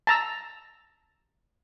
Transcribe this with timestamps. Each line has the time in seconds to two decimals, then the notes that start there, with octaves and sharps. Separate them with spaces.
0.07 A5 A#5 E6